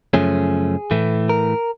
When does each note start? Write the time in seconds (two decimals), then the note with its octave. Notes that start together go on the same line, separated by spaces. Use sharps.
0.13 F#2 C#3 F3 A3 C#4 G#4
0.91 A2 E3 A3
1.29 A#4